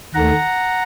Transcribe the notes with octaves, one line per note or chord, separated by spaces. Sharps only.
D#2 D#3 A3 F#5 A#5